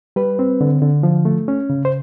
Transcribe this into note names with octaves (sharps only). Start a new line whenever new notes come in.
G3 B4
C4
D3
D3
F3
A3
C#4
C#3
C5